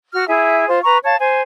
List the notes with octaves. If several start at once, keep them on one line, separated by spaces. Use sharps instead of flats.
F#4 F6
E4 G#4 E5
F4 C5
B4 A#5 C#6
C#5 F5 A5
C5 G#5